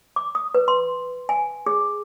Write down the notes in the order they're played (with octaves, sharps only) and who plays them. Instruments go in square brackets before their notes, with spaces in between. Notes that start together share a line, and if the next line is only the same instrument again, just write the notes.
[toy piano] D6
D#6
B4
C6
G#5
G#4